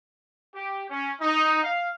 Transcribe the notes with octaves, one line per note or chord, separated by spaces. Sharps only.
G4
C#4
D#4
F5